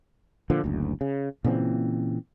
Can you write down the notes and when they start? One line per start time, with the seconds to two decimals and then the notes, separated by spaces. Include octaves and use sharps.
0.50 A#2 D3 F3
0.64 F#1 D2
1.01 C#3
1.44 A#2 C#3 E3 C4